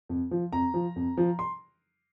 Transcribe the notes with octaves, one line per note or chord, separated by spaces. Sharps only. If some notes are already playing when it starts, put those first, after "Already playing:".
F2
F3
F2 A#5
F3
F2
F3
C6